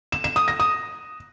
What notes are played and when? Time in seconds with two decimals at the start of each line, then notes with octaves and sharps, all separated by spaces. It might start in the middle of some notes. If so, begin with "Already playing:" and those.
0.12 E7
0.24 E7
0.36 D#6
0.48 A#6
0.60 D#6